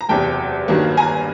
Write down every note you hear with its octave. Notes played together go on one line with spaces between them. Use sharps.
A#5
F#1 E2 C3 G5 A5
G1 G2 D#3 F#3 A#3
G#5 A#5